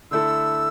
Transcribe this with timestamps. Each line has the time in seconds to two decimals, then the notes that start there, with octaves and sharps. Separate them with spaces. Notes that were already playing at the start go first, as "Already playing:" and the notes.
0.11 D3 A3 E4 A4 E6